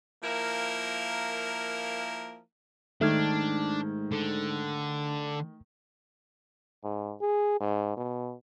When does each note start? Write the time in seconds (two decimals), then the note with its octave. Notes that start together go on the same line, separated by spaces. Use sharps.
0.23 F3 A#3 E4 A#4
3.01 G#2 D#3 A3 D4 F6 G#6
4.12 D3
6.83 G#2
7.20 G#4
7.60 G#2
7.97 B2